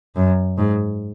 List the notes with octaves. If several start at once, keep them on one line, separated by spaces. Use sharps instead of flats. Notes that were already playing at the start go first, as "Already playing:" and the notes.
F#2
G#2